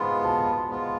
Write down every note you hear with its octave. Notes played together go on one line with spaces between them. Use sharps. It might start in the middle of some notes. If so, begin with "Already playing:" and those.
Already playing: G#2 G#3 B3 F4 B5
A5
G#2 G#3 B3 F4